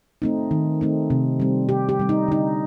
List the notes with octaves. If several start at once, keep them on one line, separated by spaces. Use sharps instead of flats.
A3 C4 D#4
D#3
A3 C4 D#4
C3
G3 C4
C3 G4
G4
G3 C4
D#4
D3 D#4